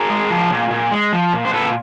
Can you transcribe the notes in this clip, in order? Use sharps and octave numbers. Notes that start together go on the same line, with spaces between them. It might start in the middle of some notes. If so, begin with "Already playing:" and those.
Already playing: G#4 A#4
G#3
F3
A#2
A#2
G#3
F3
A#2
C5
A#2 A4 B4